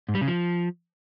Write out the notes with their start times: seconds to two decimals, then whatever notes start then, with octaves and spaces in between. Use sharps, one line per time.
0.09 G#2
0.15 G3
0.21 C#3
0.28 F3